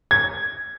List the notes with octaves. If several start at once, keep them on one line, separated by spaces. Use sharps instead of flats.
G#6